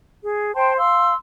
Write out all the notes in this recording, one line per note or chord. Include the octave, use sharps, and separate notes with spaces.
G#4
C5 G5 A5 C6
F5 C6 E6